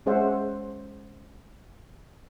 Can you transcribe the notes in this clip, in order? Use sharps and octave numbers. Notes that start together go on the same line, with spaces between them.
G#3 C#4 G#4 C5 E5 F#5